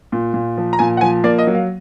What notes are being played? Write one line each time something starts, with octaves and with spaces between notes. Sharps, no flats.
A#2
A#2
F3
A#5
A#2 G#5
F#5
F3 G#5
A#3 D5
D#5
F#3
F5